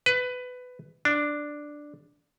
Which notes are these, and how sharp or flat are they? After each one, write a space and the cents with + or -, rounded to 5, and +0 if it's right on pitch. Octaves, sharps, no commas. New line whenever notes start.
B4 +15
D4 +5